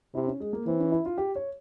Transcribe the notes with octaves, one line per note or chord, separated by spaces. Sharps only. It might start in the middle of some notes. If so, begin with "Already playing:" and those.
C3 E4
C#4
G#3
A#3
E3 C4
C#4
E4
F4
G4
C#5